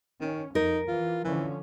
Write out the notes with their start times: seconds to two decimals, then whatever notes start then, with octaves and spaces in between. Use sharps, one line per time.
0.21 D#3 C#4
0.55 F2 D#4 A#4
0.88 E3 F4
1.24 D3 E3 F3 C#4